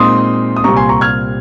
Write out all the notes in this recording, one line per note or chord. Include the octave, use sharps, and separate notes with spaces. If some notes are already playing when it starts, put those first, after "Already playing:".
Already playing: A#2 G#3 C4 D#4 C6 D#6
D#6
C2 A#2 G3 C4 A#5 C#6
G#5 C6
A#5 C#6
F6 G#6